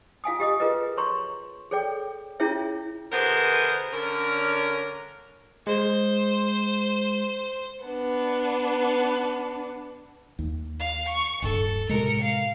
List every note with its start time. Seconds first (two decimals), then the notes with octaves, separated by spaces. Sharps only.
0.24 F4 F5 G#5 D#6
0.40 G4 D#5 D#6
0.60 F4 G#4 A#4 B4 D#5
0.97 C#5 A#5 C6 C#6
1.71 G#4 A4 C#5 D5 G5
2.40 C#4 E4 F4 G#4 C#5 E5
3.12 B2 D3 B3 G#4 A#4 C5
3.92 D3 C#4 A#4
5.67 G#3 C5
7.85 B3 D4
10.39 D#2
10.79 F5
11.08 C#6
11.42 D1 G2 A4
11.89 A2 C3 G#3 A#4 C#7
12.22 F5